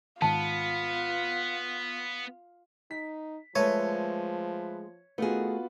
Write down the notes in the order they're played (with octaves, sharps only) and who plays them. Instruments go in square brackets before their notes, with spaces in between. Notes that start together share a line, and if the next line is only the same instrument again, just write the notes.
[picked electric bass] G#2 D#3 [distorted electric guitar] B3 [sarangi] F4 [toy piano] A5
[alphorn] D#4 [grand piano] B6
[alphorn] F3 [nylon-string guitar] G#3 A3 [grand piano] B4 E5 A5 [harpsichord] C#5
[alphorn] D#3 [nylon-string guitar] A3 G#4 [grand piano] B3 F4 F#4